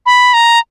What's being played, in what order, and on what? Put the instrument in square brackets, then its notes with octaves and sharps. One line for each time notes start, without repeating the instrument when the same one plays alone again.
[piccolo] B5
A#5